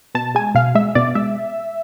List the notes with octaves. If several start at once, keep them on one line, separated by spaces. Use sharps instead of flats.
B2 A5
G#3 G#5
B2 F5
G#3 E5
B2 D5
G#3 E5